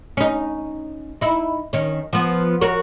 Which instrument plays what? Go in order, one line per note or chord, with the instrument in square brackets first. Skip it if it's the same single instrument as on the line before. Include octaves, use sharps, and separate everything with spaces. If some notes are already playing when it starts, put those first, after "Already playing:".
[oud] C#4 D#4
D#4 E4
D#3 C#4
F3 B3
F#4 A#4 C#5